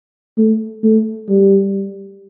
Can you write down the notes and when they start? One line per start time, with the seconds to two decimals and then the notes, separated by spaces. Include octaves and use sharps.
0.37 A3
0.83 A3
1.29 G3